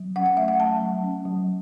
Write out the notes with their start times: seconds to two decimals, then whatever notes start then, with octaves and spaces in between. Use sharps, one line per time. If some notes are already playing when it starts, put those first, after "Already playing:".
Already playing: F#3
0.15 C#4 F#5
0.26 F#5
0.37 A3 E5
0.48 F#5
0.59 F#3 A5
0.82 F#3
1.03 C#4
1.25 F#3